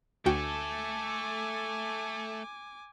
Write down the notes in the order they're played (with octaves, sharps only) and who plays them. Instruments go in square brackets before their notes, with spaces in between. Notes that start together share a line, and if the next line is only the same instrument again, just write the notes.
[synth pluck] D2 F#4 G5 [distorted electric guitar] A3 A4 [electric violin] G#5 D6